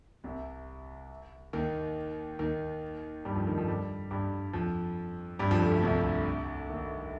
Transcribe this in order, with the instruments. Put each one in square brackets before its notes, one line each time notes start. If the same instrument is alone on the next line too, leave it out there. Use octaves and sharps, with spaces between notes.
[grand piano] C2 C3
D#2 D#3
D#2 D#3
G2 G3
F2 F3
D#2 D#3
F2 F3
G2 G3
G2 G3
F2 F3
G2 G3
F2 F3
D2 D3
D2 D3
C2 C3
D#2 D#3